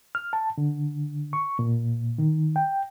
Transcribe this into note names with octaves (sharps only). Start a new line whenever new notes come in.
F6
A5
D3
C#6
A#2
D#3
G5